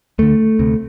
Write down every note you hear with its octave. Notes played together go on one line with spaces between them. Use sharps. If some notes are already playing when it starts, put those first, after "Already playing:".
D2 D3 A3
D2 C3